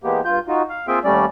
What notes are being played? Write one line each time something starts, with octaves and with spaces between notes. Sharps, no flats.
E3 G#3 A#3 B3 G4
G2 F4 G6
D#4 F4 F#4
F5
A#3 C4 F4 G#4 E5 G5
D#2 G3 A3 C#4 D5